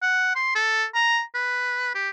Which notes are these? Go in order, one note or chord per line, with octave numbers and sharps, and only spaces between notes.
F#5
C6
A4
A#5
B4
G4